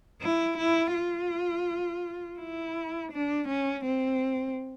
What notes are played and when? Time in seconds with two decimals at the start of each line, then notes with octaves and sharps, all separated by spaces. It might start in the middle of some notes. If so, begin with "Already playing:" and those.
0.22 E4
0.58 E4
0.94 F4
2.39 E4
3.12 D4
3.48 C#4
3.85 C4